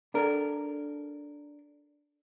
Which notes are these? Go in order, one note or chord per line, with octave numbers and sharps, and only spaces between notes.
D4 A4 A#4